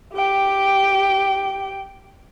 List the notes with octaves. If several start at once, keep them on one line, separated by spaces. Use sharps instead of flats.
G4 G5